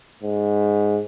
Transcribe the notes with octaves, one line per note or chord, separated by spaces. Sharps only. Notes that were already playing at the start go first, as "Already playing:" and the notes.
G#2